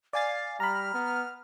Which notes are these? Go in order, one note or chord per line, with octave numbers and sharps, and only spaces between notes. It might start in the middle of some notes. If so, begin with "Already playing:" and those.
D5 F5 G#5 A6
G3 A#5 B5 F6
B3